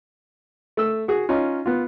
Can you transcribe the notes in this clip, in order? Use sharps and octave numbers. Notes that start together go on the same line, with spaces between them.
A3 E6
F#4 G#4
C#4 D#4 F4
B3 F4